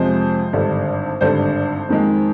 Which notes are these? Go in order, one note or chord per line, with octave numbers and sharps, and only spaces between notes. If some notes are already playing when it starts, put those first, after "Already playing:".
Already playing: F2 C3 F3 G#3 C5
G#1 G2 D3
G#1 G2 D3 C5
F2 D#3 G#3